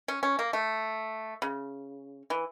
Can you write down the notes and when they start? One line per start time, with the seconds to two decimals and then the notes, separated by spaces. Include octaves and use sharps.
0.08 C#4
0.23 C#4
0.39 A#3
0.53 A3
1.42 C#3
2.30 E3